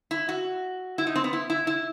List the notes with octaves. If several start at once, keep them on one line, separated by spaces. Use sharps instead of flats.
E4
F#4
E4
D#4
C4
B3
E4
E4
E4